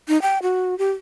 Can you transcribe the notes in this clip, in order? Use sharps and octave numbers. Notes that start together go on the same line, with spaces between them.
D#4
G5
F#4
G4